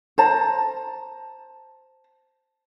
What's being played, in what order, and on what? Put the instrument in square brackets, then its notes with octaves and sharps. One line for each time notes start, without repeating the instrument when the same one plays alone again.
[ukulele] C5 A5 A#5